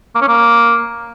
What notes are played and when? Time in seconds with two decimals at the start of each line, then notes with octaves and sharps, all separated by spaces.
0.15 A#3
0.22 C#4
0.28 A#3